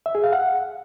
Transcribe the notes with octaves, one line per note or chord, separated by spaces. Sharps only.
E5
G#4
F5
F#5